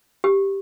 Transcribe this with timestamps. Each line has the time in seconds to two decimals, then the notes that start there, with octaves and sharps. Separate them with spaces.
0.24 G4